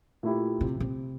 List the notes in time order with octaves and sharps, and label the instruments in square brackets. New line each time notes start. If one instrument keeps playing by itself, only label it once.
[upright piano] A#2 A3 E4 G4
[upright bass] C3
C3